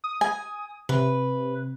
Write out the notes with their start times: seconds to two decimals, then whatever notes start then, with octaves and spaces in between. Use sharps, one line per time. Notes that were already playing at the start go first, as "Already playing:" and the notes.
0.04 D#6
0.21 G#5
0.89 C3 B4